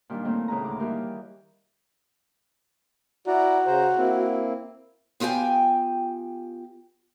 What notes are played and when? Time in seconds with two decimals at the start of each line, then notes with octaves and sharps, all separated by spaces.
0.10 A#2 D#3 G3 D4
0.24 D#3 A3 A#3 C4 C#4 E4
0.48 A2 C#3 G#3 B4 E5 A#5
0.64 D2 D6
0.79 D#3 E3 G3 A#3 G4 A#4
3.27 E4 F#4 D5 A#5
3.66 C#3 C5 A#5
3.97 A#3 C4 E4
5.20 B3 F4 G4 G5 G#5